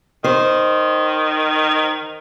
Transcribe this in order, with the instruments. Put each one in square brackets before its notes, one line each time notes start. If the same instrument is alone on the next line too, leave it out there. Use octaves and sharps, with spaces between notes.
[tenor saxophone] D#3 [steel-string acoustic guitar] C5